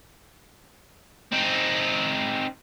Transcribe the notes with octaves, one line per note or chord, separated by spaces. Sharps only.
C4 D#4